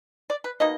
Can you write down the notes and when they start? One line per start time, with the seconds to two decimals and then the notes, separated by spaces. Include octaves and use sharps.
0.30 D5
0.44 B4
0.60 B2 A#3 D#4 D#5